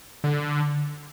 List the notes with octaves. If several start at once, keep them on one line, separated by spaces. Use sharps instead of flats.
D3